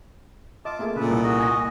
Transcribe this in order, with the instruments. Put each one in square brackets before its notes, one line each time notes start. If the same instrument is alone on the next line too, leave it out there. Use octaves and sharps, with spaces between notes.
[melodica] F4 A5 D6 [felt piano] D#5
[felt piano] A3 A#3 G#4
[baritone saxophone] A#2 [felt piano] C#3 A4 [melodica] B4
[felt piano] C2 [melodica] B3 A4
[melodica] F#4 D#5
[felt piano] G#5 A#6